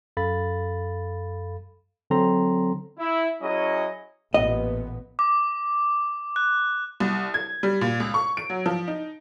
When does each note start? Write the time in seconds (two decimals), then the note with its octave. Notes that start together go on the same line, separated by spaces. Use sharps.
0.17 F#2 A4 F5 B5 A6
2.10 D3 F#3 C4 A4 A#5 C6
2.98 E4
3.42 F#3 C#4 E4 G#4 D#5
4.34 A1 A#2 B3 D#5
5.19 D6
6.36 F#6
7.00 C2
7.34 G#6
7.63 G3
7.81 A#2
8.00 C#2
8.14 C#6
8.37 D7
8.50 F#3
8.66 F3
8.88 D#4